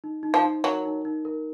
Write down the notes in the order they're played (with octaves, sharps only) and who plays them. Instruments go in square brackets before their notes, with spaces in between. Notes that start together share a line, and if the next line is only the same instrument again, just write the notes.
[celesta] D#4
D#4
[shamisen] F3
[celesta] D#4
[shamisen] F#3 [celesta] A#4
[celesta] D#4
D#4
A#4